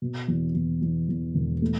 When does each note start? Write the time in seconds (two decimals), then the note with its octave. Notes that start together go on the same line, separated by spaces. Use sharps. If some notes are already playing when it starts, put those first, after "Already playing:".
0.02 B2
0.28 E2
0.55 E2
0.82 E2
1.09 E2
1.35 E1
1.62 A3